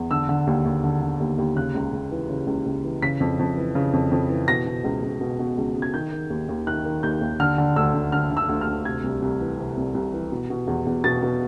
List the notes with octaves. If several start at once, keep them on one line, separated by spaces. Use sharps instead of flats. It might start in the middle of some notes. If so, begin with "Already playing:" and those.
Already playing: E2
D3 E6
D3
D#2
D#2
D3
D3
D#2
D#2
C#3 F#6
C#2
C#2
E3
C#3
C#2
C#2
E3
C#3 B6
F2
F2
E3
C#3
F2
F2
E3
B2 A#6
B2
C#2
C#2
B2
B2
C#2
C#2
G#6
D#3 G6
D#3
D#2
D#2
D#3 F#6
D#3
D#2 G6
D#2
D3 F6
D3
D2 E6
D2
D3 F6
D3
E6
D2
F6
D2
C3 G#6
C2
C2
E3
C3
C2
C2
E3
B2
B2
E2
E2
B2 A6
B2